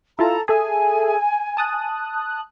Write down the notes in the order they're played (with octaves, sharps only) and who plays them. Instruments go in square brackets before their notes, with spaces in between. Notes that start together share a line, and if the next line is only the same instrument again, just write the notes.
[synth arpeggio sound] E4 F4 A5 [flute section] A4 A#5
[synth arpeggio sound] G#4 A4 E5 [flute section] G#5
[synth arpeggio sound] A5 D#6 F#6